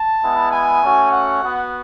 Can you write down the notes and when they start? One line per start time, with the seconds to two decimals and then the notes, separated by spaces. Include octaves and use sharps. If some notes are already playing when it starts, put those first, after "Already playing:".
Already playing: A5
0.23 G#3 B3 E4
0.53 G#5
0.82 A3 C#4 F#4
1.12 F#5
1.43 B3 F#4